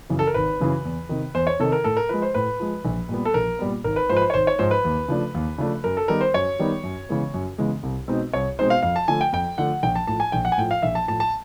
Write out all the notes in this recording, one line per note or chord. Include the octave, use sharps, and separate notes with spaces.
F#2 C#3 E3
A4
A#4
G#1 B4
F#2 C#3 E3
E2
C3 D#3
E2 C5
C#5
C3 D#3 A4
A#4
A2 A4
A#4
F3 G#3 B4
C5
A2 B4
F3 G#3
A#1
A#2 G3 B3
A4
A#1 A#4
A#2 G3 B3
G#1 A#4
B4
G#2 F3 C5
B4
C5
C#5
G#1 C5
C#5
G#2 F3 C5
B4
D#2
C#3 F3 A3 D4
D#2
C#3 F3 A3 D4
F#2 A#4
A4
D#3 G3 B3 D#4 A#4
C5
F#2 C#5
D#3 G3 B3 D#4
F#2
C#3 E3 G#3 B3
F#2
C#3 E3 G#3 B3
C2
B2 G#3 C4 D#4
C2 C#5
B2 G#3 C4 D#4 C5
F5
F2 F5
A5
D3 F3 A3 G#5
G5
F2 G5
D3 F3 A3 F#5
A#1 G5
A5
A2 F3 A5
G#5
A#1 G5
F#5
G#5
A2 F3 G5
F5
A#1 E5
A5
A2 F3 A5
A5